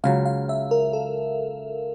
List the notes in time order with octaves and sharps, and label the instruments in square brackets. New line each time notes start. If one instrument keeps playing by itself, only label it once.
[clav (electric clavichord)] C#2 C#3 F#3 [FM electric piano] F5
[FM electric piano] F5
E5
A#4
A4